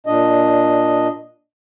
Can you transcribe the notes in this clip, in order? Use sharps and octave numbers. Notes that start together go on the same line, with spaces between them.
A#2 D4 D#5